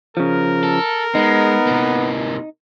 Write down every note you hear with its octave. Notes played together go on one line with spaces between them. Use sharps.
C#3 F3 A#4
A4
G#3 B3 D#4
C3 A#3